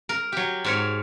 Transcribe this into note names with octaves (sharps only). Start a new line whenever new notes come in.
A#4
F#3 G4
G#2 A#4 C#5